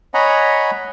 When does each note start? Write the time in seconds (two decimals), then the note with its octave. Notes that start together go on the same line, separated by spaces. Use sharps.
0.14 C#5 D#5 F#5 G#5 A#5 B5